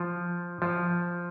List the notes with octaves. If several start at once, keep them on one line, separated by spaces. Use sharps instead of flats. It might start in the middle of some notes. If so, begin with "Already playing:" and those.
Already playing: F3
F3